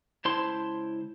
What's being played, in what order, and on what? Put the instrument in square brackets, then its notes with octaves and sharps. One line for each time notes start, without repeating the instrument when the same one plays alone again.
[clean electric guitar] C#2 E4 C5 A5 C6